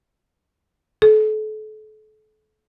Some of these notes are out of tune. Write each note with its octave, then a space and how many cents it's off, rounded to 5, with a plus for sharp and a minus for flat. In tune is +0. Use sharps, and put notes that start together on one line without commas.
A4 -35